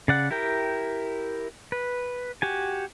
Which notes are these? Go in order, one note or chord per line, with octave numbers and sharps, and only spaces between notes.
C#3 D5 F#5
E4 G4 A#4 G5
B4
F#4 G4 G#5